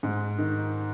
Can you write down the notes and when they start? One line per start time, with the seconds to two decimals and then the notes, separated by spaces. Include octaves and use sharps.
0.03 G#2
0.38 D#3